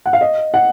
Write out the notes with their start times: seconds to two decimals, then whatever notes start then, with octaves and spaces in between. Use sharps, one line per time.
0.06 F#5
0.13 F5
0.21 D#5
0.54 F#5